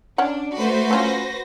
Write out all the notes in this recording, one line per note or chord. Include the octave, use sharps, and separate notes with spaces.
C#4 D4 C#5 F#5
A3 F#4 B4 C5
F#3 C#4 F4 A#6